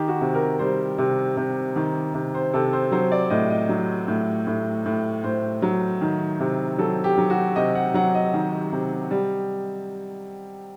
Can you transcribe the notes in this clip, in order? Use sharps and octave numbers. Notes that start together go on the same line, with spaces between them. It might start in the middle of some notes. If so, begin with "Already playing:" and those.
Already playing: D#3 G4
F#4
C3
A#4
G3 C5
C3
C3
D#3
C3
C5
C3 A4
C5
F#3 C5
D5
A2 D#5
D#5
F#3
A2
A2
A2
A2 C5
F#3
D#3
C3
F#3 A4
G4
F#3
F#4
C3 D#5
F#5
F#3 F#5
D#5
D#3
C3
G3